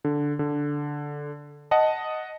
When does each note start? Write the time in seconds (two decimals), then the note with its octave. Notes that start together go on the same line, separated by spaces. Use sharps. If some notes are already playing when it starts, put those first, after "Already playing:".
0.04 D3
0.39 D3
1.71 D#5 F#5 A5